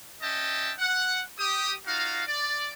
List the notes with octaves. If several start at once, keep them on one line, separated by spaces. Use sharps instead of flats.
C#4 D#5 E5 G5 A5
F#5
G4 D#6
D#4 F4 F#4 F5
D5